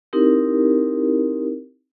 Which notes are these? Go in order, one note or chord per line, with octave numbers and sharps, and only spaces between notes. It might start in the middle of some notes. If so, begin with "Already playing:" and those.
C4 D#4 E4 G4 A#4